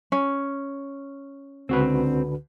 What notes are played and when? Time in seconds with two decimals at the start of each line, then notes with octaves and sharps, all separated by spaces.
0.12 C#4
1.69 C#2 D3 C4 F#4 B4